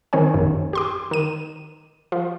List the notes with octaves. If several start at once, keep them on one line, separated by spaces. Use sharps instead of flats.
D#3 C4 C#5 G#5
A#1 F#2 D#3
G4 C6 D6
D#3 D#7
F3